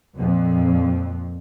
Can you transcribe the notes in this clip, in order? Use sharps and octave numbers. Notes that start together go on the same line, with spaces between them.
F2 A#2